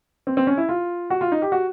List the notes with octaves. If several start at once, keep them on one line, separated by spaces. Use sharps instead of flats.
C4
C4
C#4
E4
F4
F#4
F4
D#4
G4
F#4